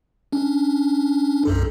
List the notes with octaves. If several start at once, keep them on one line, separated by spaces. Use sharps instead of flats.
C#4 D4
B1 F#2 A4